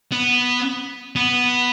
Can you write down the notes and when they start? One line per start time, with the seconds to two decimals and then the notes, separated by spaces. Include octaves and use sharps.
0.12 B3
1.16 B3